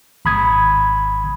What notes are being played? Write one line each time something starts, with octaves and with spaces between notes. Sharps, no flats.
G#1 B5 D#6 G#6